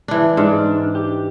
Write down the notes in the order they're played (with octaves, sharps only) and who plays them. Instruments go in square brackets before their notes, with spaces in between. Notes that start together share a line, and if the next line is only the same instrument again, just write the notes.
[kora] E3 D4
[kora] G#2 [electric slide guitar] D4
[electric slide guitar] G4